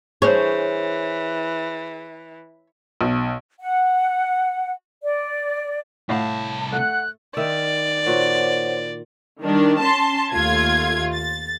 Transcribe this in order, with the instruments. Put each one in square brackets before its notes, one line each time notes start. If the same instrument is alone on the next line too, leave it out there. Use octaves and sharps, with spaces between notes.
[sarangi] E3 [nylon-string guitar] G#4 C5 [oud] C#5
[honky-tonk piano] B1
[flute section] F#5
D5
[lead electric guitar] C2 A5 [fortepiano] A2 F5 F#5
[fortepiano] A3 [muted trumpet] F#5 [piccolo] F#6
[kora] D#3 E5 [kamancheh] D5
[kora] A#2 F#4 [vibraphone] C5 C#5 F#5
[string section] D#3 G3 D4
C#4 A5 C6
D#2 A3 F4 G#6
A6